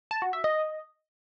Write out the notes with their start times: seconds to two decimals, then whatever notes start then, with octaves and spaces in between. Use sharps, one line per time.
0.11 A5
0.22 F#4
0.33 E5
0.44 D#5